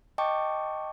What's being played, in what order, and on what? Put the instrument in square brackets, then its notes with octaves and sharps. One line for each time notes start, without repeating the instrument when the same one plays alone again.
[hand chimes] D#5 G5 A5 C#6 D6